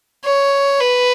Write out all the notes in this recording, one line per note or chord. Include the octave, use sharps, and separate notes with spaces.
C#5
B4